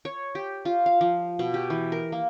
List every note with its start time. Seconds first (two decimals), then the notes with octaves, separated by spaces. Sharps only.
0.05 C#5
0.35 G4
0.65 F4
0.86 F5
1.01 F3
1.39 B2
1.54 G4
1.70 E3
1.92 A#4
2.12 A#3